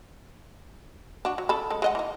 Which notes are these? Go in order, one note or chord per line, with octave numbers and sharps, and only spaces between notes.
D4 F#4
F#3
C#3 A4 B5
G#3 A4
G#3 D#5 F#5
E3 D#4